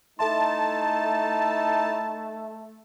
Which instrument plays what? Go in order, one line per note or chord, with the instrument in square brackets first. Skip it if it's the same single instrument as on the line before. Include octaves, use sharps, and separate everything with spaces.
[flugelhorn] A3 [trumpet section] D#4 E4 [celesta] A4 E5 C6 [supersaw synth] A5